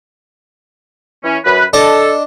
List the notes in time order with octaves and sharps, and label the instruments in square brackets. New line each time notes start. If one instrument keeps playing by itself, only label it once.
[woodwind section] E3 C#4
F#2 B4
[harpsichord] D4 D#5 [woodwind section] A4